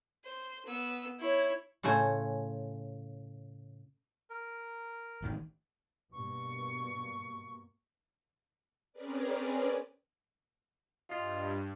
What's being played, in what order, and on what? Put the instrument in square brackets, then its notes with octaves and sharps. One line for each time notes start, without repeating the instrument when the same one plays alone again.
[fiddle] C5
B3 E6
E4 C#5
[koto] A2 C#3 A3 C5 G#5
[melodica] A#4
[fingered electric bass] A1 D#3
[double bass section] G2 B2 A#3 [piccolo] C#6
[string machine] C4 C#4 G#4 A#4 B4 D5
[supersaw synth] G2 [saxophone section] F4 D#5